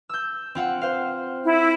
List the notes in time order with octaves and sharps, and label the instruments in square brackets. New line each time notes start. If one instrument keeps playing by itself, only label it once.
[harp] E6 G6
C4 F4 F#5
C5 F5
[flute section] E4